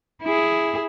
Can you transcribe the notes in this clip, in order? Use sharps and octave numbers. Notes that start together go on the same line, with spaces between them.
E4 G#4